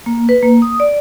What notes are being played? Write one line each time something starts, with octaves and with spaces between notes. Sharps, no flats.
A#3
B4
A#3
D#6
D5